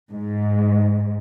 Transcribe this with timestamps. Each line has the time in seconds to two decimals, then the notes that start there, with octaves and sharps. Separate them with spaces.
0.11 G#2